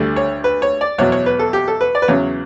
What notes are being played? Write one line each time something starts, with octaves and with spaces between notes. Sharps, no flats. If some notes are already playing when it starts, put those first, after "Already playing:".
Already playing: D2 D3 G3
C#5
B4
C#5
D5
E2 B2 F#3 C#5
C#5
B4
A4
G4
A4
B4
D5
B4
E2 C#3 F#3 C#5